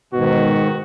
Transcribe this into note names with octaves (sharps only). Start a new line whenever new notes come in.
G#2 B2 D#3 F#4